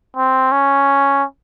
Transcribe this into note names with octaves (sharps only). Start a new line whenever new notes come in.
C4
C#4